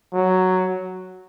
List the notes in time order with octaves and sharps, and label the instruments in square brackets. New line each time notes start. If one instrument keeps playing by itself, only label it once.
[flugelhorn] F#3